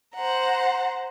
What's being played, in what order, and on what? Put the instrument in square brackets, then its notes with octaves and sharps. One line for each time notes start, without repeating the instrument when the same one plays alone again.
[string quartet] C5 F#5 A#5